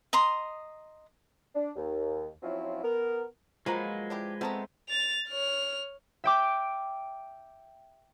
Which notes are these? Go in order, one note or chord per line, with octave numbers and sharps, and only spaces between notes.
D#5 A#5 C6 D#6
D4
D#2
F3 F#3 C4 C#4 E4 F4
B3 A#4
F3 F#3 G#3 A#3 A#4 B4 A#5 B5
D4 E4 G4
G3 A3 B3 C4 A5 A#5
A6 F7
C#5 F6
E5 G5 D6